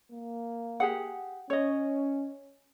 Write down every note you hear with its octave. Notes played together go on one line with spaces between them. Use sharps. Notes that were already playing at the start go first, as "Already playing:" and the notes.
A#3
G4 G#4 F#5
C#4 C#5 D#5